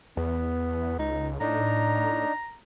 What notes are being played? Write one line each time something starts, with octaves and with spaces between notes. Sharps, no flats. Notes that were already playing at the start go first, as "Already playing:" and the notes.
E2 B3
C#2 D#4
A2 D4 D#4 A#5